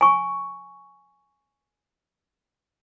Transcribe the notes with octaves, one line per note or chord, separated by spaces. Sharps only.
G#5 C#6